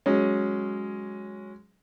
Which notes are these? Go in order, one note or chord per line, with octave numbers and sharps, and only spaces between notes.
F#3 G#3 C#4